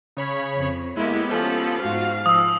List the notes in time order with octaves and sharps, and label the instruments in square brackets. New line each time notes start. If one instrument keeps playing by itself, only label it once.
[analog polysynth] C#3 C#5 B5
[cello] F2
[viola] G#3 [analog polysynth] A#3 E4 [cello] B3 G4
[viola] F3 [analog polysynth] C#4 A4
[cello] G#2 [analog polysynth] F4 F#4 [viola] F5
[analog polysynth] F3 [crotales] D#6 E6